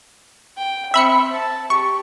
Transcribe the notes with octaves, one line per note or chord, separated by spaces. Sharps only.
G5
C4 E5 B5 C#7
A5
G4 C#6